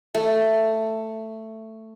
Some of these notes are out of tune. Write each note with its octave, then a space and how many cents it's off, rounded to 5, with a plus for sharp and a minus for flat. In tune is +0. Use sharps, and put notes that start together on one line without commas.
A3 +10